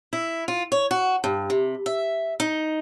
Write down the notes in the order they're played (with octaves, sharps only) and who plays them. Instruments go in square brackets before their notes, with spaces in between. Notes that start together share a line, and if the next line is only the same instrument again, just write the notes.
[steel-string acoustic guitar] E4
F4
C#5
F#4
G2
C3
E5
D#4